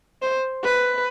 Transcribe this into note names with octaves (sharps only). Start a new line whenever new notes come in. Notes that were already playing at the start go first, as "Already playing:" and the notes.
C5
B4